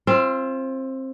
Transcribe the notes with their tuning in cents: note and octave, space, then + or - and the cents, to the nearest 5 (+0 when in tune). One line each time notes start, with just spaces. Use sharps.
C4 +20 F4 -25